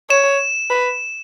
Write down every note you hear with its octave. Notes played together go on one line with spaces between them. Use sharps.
C#5 E7
B4